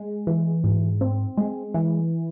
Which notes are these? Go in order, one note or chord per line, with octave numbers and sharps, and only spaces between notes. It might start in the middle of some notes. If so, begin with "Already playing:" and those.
Already playing: G#3
E3
G#2
C4
G#3
E3